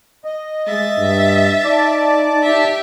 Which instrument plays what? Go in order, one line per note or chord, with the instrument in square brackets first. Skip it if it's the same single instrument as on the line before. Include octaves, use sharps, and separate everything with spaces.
[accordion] D#5
[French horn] G#3 [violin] E5 A6
[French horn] G2
[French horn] D#4 [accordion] D5 A5 D6
[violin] G4 E5